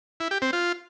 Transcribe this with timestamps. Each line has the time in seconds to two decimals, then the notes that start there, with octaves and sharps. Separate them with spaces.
0.20 E4
0.31 G4
0.42 C4
0.53 F4